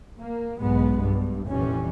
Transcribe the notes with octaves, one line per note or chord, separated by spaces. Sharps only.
A#3
B1 G#2 G#3 B3
G2
F1 F2 A#2 E3 G3 C#4